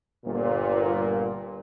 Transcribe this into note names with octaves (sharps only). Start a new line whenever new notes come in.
G1 A#2